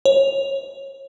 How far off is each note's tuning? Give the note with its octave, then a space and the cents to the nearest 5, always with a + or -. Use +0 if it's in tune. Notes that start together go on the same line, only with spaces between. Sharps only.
C#5 -25